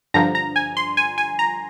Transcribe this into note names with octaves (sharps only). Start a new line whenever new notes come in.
G2 D3 F3 A#5
A#5
G#5
C6
G#5
G#5
A#5